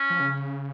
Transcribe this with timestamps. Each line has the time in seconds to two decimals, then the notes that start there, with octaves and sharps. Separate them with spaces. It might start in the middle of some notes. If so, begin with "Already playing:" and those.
Already playing: C#4
0.10 F3
0.20 C#3